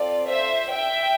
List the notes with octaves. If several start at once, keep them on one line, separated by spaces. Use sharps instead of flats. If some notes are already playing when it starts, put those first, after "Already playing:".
Already playing: C4 F4 A4 D5
C5 E5
E5 G5